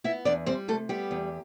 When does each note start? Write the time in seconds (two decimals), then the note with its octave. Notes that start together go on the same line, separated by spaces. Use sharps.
0.04 B3 E4 E5
0.25 E2 D4 D5
0.46 G3 C4 C5
0.68 C3 A3 A4
0.89 G3 B3 G4
1.11 E2